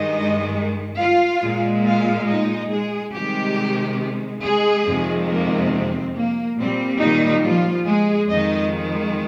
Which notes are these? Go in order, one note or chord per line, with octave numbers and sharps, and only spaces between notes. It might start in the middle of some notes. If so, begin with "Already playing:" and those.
Already playing: G2 D#3 G#3 D#4 D#5
F4 F5
A#2 G#3
F4 F5
D#4 D#5
G#3 G#4
C3 D#3 G3 G#3 G4
G#3 G#4
F2 C3 D#3 G#3
A#3 A#4
C4
A#3
A#2 G3 C4
D#3 D#4
F3 F4
G#3 G#4
F2 D#3 G#3 D#4 D#5